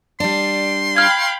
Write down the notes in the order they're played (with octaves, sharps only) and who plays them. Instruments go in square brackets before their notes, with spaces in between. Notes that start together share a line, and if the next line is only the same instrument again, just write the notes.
[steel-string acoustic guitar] G3 D4 [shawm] C6
[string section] F5 G5 B5 [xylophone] F6 G#6